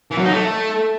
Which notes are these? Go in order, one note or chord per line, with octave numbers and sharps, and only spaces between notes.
E3
F#3
D#4
A3